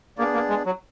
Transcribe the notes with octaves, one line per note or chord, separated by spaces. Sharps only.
A#3 B3 D4 G#4 D5
A#3
G#3
F#3